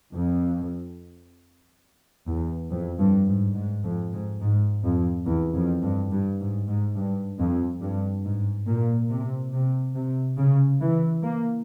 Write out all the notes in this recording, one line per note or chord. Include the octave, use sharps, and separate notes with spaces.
F2
E2
F2
G2
G#2
G#2
F2
G#2
G#2
F2
E2
F2
G2
G2
G#2
G#2
G2
F2
G2
G#2
A#2
C3
C3
C3
C#3
E3
A#3